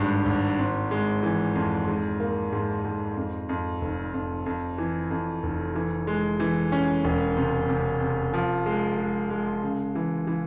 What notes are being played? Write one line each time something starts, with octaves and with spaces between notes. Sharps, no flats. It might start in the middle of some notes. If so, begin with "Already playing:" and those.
Already playing: G#1 G2 G#3
G#1
C4
G#3
E3
F2
G#2
A#3
G#2
G#2
F2
F2
F1
F2
F2
E3
F2
F1
E3
G#3
E3
C#4
E1
C3
C3
C3
F3
G#3
G#3
G#3
C#3
E3
E3